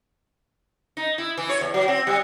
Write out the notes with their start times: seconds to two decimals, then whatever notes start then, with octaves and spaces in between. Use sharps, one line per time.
0.97 D#4
1.18 E4
1.37 E3
1.50 C#5
1.61 E2
1.74 F#3
1.88 C4
2.07 G3